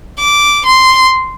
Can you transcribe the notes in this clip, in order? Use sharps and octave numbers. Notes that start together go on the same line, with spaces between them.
D6
C6